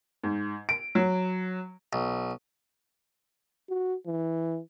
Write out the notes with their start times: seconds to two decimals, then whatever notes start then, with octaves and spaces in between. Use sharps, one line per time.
0.23 G#2
0.69 D7
0.95 F#3
1.93 B1
3.69 F#4
4.07 E3